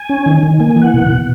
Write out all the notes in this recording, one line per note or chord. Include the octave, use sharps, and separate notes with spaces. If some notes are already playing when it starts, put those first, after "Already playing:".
Already playing: G#5
C#4
D#3
D#3
A#3 G#5
G#5
E3
F#5
B2
B2